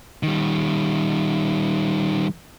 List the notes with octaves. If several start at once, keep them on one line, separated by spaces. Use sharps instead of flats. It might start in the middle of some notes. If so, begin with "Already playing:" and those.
D#3 G3